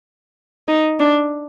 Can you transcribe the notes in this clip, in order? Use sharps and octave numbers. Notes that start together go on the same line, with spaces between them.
D#4
D4